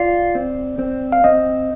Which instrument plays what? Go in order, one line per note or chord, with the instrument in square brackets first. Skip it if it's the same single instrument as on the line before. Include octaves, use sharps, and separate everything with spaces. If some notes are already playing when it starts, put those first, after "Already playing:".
Already playing: [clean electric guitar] F4 [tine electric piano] D5
[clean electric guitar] C4
C4
[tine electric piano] F5
[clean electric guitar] C4 [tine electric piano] D#5